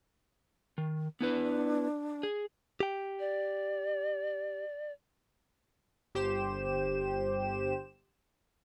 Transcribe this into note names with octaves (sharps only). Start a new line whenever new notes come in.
D#3
B3 D4 E4 B4
G#4
G4 G5
D5
G1 G4 C5 E7